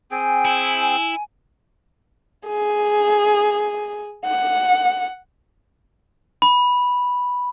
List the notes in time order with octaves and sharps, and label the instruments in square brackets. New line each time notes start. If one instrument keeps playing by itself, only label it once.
[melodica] C4 G#4 G5 [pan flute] G#5
[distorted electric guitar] E4
[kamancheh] G#4
F#5
[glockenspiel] B5